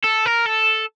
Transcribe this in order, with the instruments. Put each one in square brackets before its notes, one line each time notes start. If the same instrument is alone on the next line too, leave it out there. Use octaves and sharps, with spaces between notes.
[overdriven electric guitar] A4
A#4
A4